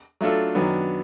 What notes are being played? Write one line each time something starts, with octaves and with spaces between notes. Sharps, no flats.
F#3 A3 D4 F4 A4
F#2 D#3 F#3 B3 D4